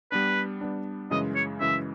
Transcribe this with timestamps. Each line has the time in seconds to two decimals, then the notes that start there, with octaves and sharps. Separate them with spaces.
0.11 G3 B3 D4 B4
0.61 G3 B3 D4
1.11 F#2 C#3 E3 G#3 D#5
1.35 C#5
1.60 F#2 C#3 E3 G#3 E5